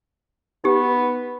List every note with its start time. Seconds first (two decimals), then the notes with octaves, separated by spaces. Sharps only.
0.64 B3 D#4 G4